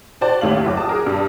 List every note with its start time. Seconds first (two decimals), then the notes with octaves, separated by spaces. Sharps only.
0.21 F#4 C5 D5 A5
0.41 A1 D#2 A3 C#5 F5 F#7
0.65 F#1 F4 D6
0.77 A5 D#6
0.89 F#4 G#4 A#4
1.06 G2